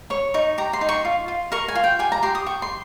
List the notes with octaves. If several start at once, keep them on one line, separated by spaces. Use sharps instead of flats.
C#5 C#6
D#4 C#6
G4 A#5
C6
D#4
C#6
F4
F4
A#4 C#6
G#5
F4
G5
G4 G#5
A#5
G4 C6
D#6
G4 C#6
C6